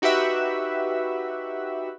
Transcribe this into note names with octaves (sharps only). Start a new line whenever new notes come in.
D#4 F#4 G4 B4 E5